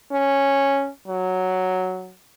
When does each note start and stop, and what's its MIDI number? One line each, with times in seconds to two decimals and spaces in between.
0.12 0.89 61
1.08 2.13 54